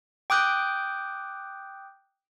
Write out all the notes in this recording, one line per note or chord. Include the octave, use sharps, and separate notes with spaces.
G5 D6 D#6 F#6 G6